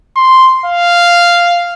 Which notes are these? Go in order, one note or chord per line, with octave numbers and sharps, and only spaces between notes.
C6
F5